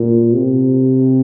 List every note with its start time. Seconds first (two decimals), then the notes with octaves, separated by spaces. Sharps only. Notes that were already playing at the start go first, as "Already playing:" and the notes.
Already playing: A#2
0.33 C3